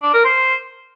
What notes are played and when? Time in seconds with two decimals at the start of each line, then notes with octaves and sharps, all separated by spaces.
0.02 D4
0.14 A#4
0.25 C5